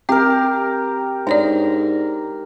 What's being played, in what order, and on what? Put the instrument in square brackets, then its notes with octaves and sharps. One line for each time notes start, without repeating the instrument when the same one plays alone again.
[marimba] C4 [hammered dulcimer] G4 A#4
[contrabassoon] G#2 [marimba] D4 C#5 D5 [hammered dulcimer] A#5